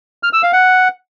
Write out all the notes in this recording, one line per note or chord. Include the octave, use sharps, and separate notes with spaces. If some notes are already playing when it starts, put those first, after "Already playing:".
F6
E6
F5
F#5